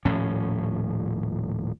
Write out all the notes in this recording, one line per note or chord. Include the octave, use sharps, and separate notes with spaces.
D#1 A2 F3 C#4